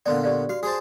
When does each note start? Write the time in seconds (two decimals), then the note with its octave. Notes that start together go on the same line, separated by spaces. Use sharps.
0.06 A#2 D3 B3 D5 C6
0.24 G4 D5 F5
0.49 F#4 F5
0.63 F#4 G#4 C5 A5